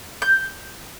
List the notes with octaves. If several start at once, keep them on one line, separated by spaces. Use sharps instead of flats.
G6